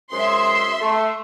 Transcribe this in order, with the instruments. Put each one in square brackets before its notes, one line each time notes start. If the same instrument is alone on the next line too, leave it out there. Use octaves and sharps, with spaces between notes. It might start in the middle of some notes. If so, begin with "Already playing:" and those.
[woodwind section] F#2 G#3 C5 [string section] E5 C6
[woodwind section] A3